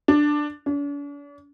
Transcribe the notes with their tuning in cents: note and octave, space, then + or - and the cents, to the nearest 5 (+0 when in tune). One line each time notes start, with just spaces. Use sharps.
D4 +10
D4 -45